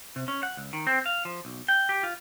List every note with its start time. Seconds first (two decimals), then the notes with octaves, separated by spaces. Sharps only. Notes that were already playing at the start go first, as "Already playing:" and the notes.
0.16 C3
0.28 C#4
0.43 F#5
0.57 C#2
0.73 D#3
0.87 C4
1.06 F5
1.25 F3
1.45 B1
1.68 G5
1.89 G4
2.03 F4